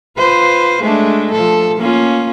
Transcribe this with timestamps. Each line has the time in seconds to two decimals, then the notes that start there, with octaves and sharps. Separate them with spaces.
0.18 F4 B4 C5
0.82 G#3 A3 D4
1.32 F3 A4
1.78 A#3 C#4 F4